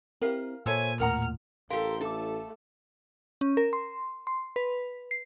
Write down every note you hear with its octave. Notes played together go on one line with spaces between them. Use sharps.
C4 E4 G4 A#4 F5
A#2 A4 C5 C#5 E5 G#5 E6
D#2 A2 A#4 F#5 A#5 F6
A1 G4 A4 A#4 F5 C6
A3 E4 A4 D6
C#4
A#4
C6
C6
B4
C7